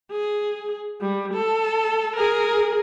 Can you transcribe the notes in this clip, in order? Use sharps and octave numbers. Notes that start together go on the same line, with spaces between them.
G#4
G3
A4
G#4 A#4